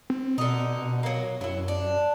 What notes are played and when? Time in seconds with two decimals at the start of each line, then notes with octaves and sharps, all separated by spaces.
0.10 C4
0.38 B2 D3 D#4
1.03 F#3 A#3
1.41 F#2 F#3 E4
1.68 D4